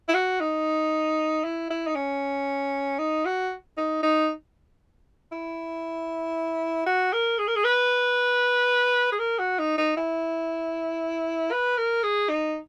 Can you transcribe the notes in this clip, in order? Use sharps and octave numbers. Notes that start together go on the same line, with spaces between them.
E4
F#4
D#4
E4
E4
D#4
C#4
D#4
F#4
D#4
D#4
E4
F#4
A#4
G#4
A#4
G#4
B4
G#4
A#4
F#4
D#4
D#4
E4
B4
A#4
G#4
D#4